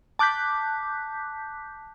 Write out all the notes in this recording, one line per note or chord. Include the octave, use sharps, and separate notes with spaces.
A5 D6 F#6 G6 B6